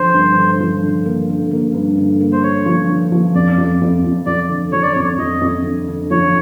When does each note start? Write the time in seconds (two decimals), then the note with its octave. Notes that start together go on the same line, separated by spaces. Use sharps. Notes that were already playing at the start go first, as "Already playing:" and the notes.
Already playing: D3 F3 C5
0.14 G2
0.37 D3
0.60 F3
0.83 D3
1.05 A#3
1.29 D3
1.51 A#3
1.74 G2
1.97 D3
2.20 A#3
2.33 C5
2.43 D3 C#5
2.66 F3
2.89 D3
3.12 F3
3.35 F2 D5
3.58 F2
3.81 F2
4.04 F3
4.26 F2 D5
4.49 D3
4.72 F3 C#5
4.83 D5
4.93 C#5
4.96 F2
5.18 F2 D#5
5.41 F2
5.64 D3
5.88 D3
6.10 F3 C#5